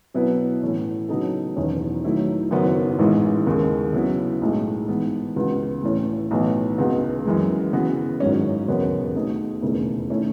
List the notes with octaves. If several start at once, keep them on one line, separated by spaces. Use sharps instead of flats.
B2 F#3 B3 E4 B4
A2 E3 A3 C#4
C#3 F#3 B3 D#4 A4
E1 E2 D#3 F#3 C#4
D#3 F#3 A3 E4
F#1 F#2 D#3 F#3 B3
A1 G#2 E3 G#3
D#2 C#3 G#3
C#3 F#3 B3 E4
B1 A2 G#3
G#2 E3 B3
C#2 C#3 E3 B3 F#4
A2 E3 A3 C#4
B1 A2 E3 B3
C#2 C#3 G#3 B3 F#4
F#2 E3 G#3
C#3 E3 B3 F#4
G#1 G#2 F#3 C#4
E1 D#2 C#3 F#3 B3
B2 A3 D#4 G#4
E1 D#2 C#3 E3 A3
D#3 A3 C#4 E4